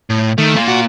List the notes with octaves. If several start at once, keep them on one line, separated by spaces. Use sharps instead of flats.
A2
D#3 A3
A#3 F4
F#4